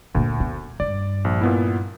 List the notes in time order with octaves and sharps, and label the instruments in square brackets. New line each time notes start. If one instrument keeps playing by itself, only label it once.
[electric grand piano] D2 [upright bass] A#2 A#3
[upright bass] B3
[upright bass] G2 [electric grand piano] D5
[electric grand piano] A#1
A#2 B3 E4